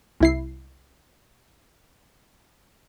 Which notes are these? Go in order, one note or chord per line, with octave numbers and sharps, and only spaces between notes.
C2 E4 C7